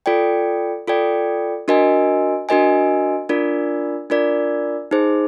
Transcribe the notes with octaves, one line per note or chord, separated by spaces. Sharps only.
F4 A4 D5 G5
F4 A4 D5 G5
D4 F#4 A#4 D#5 G#5
D4 F#4 A#4 D#5 G#5
D4 F4 A#4 D5
D4 F4 A#4 D5
D#4 G#4 C5